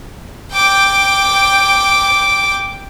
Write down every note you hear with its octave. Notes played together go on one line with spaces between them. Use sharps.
G5 D6